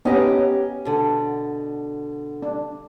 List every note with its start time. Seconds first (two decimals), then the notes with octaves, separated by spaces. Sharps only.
0.05 B3 C#4 D#4 G4 D#5
0.85 B2 D3
2.42 D4